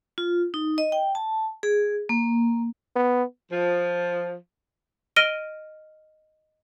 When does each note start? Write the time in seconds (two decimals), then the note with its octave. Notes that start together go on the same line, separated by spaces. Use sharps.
0.18 F4
0.54 D#4
0.78 D#5
0.92 G5
1.15 A5
1.63 G#4
2.09 A#3
2.96 B3
3.51 F3
5.16 D#5 F6 A#6 D7 D#7 G7